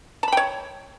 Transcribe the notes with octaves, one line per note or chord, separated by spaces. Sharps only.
C#5 G5 A5 B5